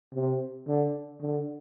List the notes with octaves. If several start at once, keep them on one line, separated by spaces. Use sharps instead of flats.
C3
D3
D3